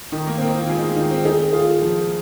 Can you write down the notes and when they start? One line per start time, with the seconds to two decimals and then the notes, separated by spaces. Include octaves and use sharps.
0.12 D#3 D#4
0.27 A#3
0.38 D#3 C4
0.48 D#4
0.59 F4
0.69 G#3 G#4
0.77 D#4
0.83 F4
0.96 D#3 D#4
1.11 C4
1.25 D#4 G#4
1.53 F4 G#4
1.82 F3